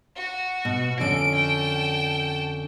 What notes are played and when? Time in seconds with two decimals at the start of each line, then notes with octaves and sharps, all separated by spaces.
0.16 F#4
0.65 B2
1.00 F2 D3 C#4 D7
1.36 G5 A5